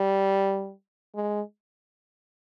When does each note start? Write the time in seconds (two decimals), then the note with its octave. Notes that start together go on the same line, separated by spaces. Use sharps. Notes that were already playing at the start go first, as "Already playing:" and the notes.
Already playing: G3
1.15 G#3